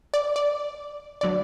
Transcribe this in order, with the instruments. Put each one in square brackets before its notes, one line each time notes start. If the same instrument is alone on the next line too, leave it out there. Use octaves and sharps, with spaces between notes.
[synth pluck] D5
D5
D3 F#3 D5